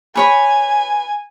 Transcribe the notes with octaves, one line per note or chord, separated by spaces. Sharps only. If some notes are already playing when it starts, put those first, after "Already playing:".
B4 C#5 G#5 B5